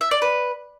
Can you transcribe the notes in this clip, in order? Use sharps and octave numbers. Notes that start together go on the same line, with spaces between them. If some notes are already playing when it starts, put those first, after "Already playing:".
E5
D5
B4